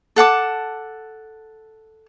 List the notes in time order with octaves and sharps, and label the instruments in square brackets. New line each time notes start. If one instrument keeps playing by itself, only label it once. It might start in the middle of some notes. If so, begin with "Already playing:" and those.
[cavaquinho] A4 F#5 A5 D6